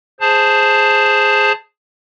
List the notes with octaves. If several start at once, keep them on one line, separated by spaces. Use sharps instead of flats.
G#4 C5 A5